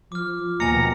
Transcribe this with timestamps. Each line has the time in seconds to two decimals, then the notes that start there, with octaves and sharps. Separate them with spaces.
0.12 F3 D6 F6
0.60 D#2 B2 G#5 A#5 C#7